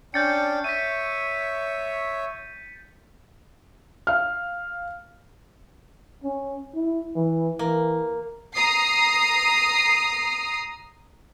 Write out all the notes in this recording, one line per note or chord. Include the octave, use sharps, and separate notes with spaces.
C#4 D4 G5 G6 A6 C#7
C#5 E5 B6 D#7
F5 F6
C#4
E4
E3
E3 A#3
A#5 D#6 C7